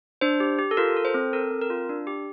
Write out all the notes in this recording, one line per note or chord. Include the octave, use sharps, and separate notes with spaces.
D4 C5
G4
G4
A4
F4 A#4
A4
C5
C4
A4 A#4
C4
A#4
F4
D4
G4